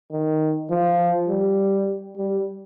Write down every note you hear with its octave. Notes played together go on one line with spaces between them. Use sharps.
D#3
F3
G3
G3